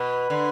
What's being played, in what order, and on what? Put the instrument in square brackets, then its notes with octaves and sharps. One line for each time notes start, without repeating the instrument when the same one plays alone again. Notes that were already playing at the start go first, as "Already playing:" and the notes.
Already playing: [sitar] B2 [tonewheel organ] B4
[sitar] D3